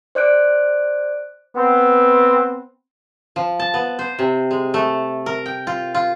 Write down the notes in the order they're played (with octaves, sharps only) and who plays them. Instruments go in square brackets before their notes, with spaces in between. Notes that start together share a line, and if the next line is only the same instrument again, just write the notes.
[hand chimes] C5 D5 F#6 D7
[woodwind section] B3 C4
[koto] F3
A5
B3
C5
C3
G#3
A3
A#4
G5
F4
F4